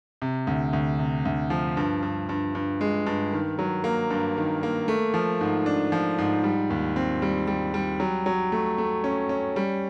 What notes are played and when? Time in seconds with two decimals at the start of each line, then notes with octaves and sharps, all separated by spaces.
0.22 C3
0.47 D2
0.73 D2
0.99 C3
1.25 D2
1.50 F3
1.77 G2
2.03 G2
2.29 G2
2.55 G2
2.81 G#3
3.06 G2
3.33 D#3
3.59 F#3
3.84 A#3
4.10 G2
4.37 D#3
4.63 A#3
4.88 A3
5.14 F3
5.41 G#2
5.66 D4
5.92 F3
6.18 G#2
6.44 G3
6.70 D#2
6.96 C4
7.22 G3
7.47 G3
7.74 G3
8.00 F#3
8.26 F#3
8.52 A3
8.78 A3
9.04 C#4
9.29 C#4
9.56 G3